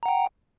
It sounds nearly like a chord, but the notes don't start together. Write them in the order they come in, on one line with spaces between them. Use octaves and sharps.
A#5 F#5 G5